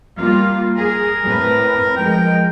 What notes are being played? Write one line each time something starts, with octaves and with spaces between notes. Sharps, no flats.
G3 A#3 F4 F5
G#4 A#4
A2 C4 B4
F3 G#3 A#4 G5